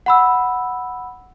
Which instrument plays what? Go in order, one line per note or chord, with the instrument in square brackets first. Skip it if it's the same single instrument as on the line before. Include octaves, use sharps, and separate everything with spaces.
[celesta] F#5 B5 E6